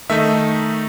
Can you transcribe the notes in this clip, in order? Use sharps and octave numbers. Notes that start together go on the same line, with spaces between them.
D#3 A3 D#4 E5